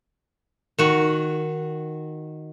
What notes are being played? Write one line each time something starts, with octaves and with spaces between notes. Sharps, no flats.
D#3 F#4